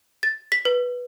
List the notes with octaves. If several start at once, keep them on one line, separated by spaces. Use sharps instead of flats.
A6
B6
B4